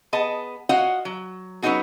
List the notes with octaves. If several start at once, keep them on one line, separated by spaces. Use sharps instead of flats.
B3 G#4 D#5 A5
F4 F#4 C#5 D#5 F5 F#5
F#3
F#3 B3 C#4 D#4 F#4 G#4